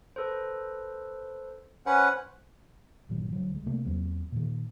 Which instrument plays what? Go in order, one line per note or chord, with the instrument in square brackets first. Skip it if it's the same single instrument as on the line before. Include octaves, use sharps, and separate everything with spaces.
[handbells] A4 B4 C5
[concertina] C#4 B4 F#5 [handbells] C5 G#5
[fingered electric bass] G1 A#2 D#3 F#3
D3 F#3
C2 G#3
C3 A3 A#3
E2 F#3 A#3 C4
A#2 D#3